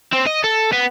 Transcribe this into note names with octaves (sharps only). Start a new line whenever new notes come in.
C4
D#5
A4
B3